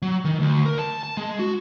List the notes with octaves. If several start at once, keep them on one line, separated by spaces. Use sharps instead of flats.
F#3
D#3
D2
A#4
A5
A5
G#3
F#4